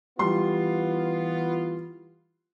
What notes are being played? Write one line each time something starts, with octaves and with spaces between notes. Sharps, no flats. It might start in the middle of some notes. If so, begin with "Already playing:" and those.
E3 G3 B3 F4 C6